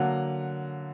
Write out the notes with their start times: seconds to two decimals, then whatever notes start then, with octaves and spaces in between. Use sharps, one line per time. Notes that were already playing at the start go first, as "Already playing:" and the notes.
Already playing: D3 F#3 A#3 F#5